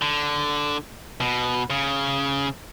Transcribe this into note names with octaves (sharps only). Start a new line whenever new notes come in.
D3
B2
C#3